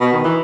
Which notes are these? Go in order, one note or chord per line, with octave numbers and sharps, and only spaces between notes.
B2
D#3
E3